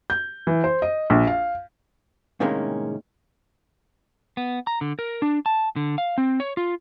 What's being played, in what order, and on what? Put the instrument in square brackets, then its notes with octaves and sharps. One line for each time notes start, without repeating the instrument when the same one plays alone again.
[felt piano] G6
E3
C5
D#5
A#1
F5
[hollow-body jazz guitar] A2 C3 D#3 G#3 A#3 C#4
[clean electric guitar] B3
A#5
D3
A#4
D4
A5
D3
F5
C4
C#5
F4